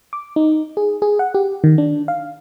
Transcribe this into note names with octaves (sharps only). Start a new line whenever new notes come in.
D6
D#4
G#4
G#4
F#5
G4
D#3
D4
F5